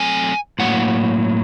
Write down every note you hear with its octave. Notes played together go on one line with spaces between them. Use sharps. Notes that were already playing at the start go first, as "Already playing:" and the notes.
Already playing: F#3 A3 C4 G#5
A2 F#3 A#3 F#5